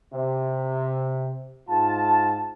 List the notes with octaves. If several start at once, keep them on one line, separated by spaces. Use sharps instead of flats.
C3
G#2 F4 A5